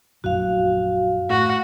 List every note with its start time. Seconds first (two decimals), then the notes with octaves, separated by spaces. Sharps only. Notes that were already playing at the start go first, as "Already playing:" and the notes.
0.24 A#1 F#2 F#4 F5
1.30 A2 F#4 F#5